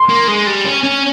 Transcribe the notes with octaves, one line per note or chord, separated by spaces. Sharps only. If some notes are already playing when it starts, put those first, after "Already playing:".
Already playing: C6
A#3
G#3
G3
C#4
C#4